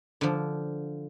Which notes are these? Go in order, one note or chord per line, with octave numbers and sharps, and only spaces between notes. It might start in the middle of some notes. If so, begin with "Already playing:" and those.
D3 F3